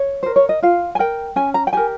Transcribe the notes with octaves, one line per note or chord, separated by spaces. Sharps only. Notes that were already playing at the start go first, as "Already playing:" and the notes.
Already playing: C#5
A#4 C5
C#5
D#5
F4 F5
G#5
A#4 G5
C#4 G#5
A#5
G5
G4 A#4 G#5